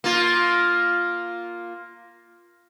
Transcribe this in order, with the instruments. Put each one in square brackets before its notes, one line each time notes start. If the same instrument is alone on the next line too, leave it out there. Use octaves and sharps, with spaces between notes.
[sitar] A#3 F4